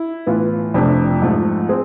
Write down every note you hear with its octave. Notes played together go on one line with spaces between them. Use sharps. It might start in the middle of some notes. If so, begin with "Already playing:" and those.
Already playing: E4
A2 E3 B3 F4
F2 C3 F3 A3 D4
G#2 F3 A3
C4 G#4